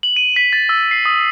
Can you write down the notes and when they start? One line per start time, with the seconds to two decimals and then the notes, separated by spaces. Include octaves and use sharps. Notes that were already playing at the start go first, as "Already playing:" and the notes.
0.03 F#7
0.16 D#7
0.36 B6
0.53 A6
0.69 E6
0.91 C7
1.05 D#6